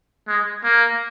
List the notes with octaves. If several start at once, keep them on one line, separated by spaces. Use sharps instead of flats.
G#3
A#3